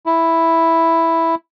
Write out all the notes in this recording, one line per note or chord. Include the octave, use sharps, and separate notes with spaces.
E4